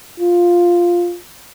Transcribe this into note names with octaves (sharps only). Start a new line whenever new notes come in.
F4